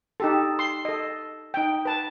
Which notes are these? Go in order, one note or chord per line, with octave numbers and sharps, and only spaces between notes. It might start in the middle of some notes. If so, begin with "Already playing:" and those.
D#4 G4 A4
C6
A4 D#5
D#4 G5
B4 A5